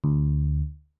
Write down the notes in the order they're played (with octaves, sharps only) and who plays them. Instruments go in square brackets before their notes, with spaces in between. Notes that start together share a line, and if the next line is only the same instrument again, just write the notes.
[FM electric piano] D2